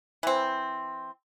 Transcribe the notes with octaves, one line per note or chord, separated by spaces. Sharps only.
E3 C4